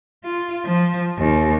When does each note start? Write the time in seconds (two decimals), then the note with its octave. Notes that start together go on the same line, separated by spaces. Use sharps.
0.24 F4
0.65 F3
1.18 D#2